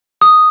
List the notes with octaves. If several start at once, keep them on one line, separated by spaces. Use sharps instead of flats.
D#6